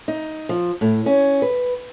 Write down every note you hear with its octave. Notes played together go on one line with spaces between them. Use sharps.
D#4
F3
A2
C#4
B4